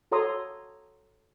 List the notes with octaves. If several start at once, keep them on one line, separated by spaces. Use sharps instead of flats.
F#4 A4 C#5 A#5 C6 D#6